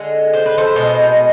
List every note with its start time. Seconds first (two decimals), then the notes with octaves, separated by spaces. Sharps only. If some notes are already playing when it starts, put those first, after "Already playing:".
Already playing: D3 G#3
0.33 C5
0.46 B4
0.58 A4 C5
0.76 B2 G#3